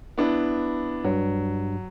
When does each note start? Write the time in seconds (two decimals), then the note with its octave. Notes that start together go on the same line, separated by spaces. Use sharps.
0.18 B3 D4 E4
1.04 G2 F#3